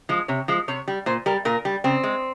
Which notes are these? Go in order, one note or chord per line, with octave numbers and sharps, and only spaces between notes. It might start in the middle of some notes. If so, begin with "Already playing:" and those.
F3 G#3
C3 C#5
F3 G#3
C3 C#5
G3
A#2 C5
G3 A#4
A#2 A#4
G3
C#3 C4
G#3